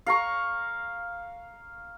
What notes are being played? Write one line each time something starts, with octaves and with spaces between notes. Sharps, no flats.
F5 A#5 C#6